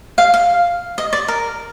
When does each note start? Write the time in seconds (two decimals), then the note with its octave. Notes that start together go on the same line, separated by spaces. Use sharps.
0.18 F5
0.34 F5
0.98 D#5
1.13 D5
1.28 A#4